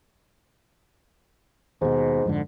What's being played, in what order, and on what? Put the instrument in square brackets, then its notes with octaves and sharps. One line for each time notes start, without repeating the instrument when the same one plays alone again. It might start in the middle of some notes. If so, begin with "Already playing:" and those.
[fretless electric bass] D#2 B2 [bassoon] G#2
[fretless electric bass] F2 G#2 D3